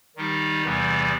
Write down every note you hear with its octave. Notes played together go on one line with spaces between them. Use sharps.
D#3 G3 D#4 G4
E2 C3 E3 G3 B3